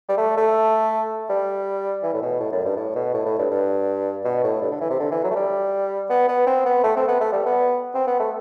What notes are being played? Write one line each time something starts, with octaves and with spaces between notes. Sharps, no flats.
G3
A3
A3
G3
E3
A2
B2
A2
F#2
G2
A2
B2
A2
A2
G2
G2
B2
A2
G2
D3
E3
C3
D3
E3
F#3
A3
G3
B3
B3
C4
B3
A3
C4
B3
A3
G3
B3
C4
B3
A3